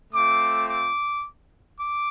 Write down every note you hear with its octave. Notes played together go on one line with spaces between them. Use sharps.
A3 C4 F4 D6
D6
D6